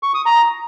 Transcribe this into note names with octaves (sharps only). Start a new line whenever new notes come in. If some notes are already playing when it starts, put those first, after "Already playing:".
C#6
D#6
A#5